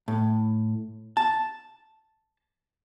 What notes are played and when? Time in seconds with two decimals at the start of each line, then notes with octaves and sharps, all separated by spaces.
0.08 A2
1.17 A5